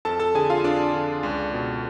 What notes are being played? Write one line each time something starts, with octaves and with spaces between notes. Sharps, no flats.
F2 A4 A5
A4 A5
D3 G#4 G#5
F4 F5
F2 D4 D5
D3
C#2
B2